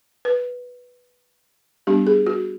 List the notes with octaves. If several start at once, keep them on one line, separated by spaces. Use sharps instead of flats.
B4
G3 B3 D4 G4
G#4
F#4